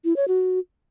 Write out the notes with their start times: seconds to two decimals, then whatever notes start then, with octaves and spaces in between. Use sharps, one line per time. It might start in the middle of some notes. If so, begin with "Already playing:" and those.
0.05 E4
0.16 C#5
0.28 F#4